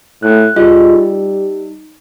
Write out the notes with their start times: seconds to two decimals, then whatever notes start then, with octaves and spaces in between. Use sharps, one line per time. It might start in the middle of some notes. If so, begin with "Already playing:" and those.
0.23 A2 F#6
0.56 G3 F4 G#4 D#5
0.94 D#4